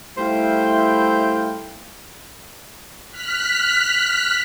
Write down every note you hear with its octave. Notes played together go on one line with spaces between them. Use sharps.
G3 A3 E4 C5 F5 G5
F6 F#6 B6